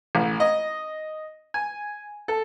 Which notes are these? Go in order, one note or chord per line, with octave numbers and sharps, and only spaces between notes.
A1
D#5
G#5
A4